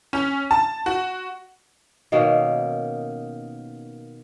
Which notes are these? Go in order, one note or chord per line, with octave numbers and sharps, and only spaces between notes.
C#4
A5
F#4
B2 D#3 A#3 C#4